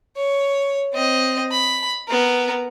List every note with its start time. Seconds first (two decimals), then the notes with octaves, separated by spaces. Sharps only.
0.16 C#5
0.93 C4 D#5
1.51 B5
2.08 B3 A#4